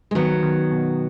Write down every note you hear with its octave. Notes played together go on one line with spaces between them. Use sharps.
G#3
D#3 F#3 B3
D#3
B2